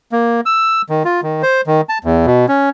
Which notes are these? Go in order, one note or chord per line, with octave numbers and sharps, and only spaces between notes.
A#3
E6
D#3
F4
D#3
C5
D#3
A5
E2
B2
C#4